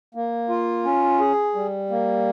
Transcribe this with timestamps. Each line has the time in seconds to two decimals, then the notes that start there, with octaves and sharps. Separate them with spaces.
0.15 A#3
0.49 F4
0.85 C#4
1.20 G#4
1.55 G3
1.90 A#3